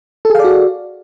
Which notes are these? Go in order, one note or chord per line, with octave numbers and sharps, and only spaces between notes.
F#4 G#4 A4 D5 F5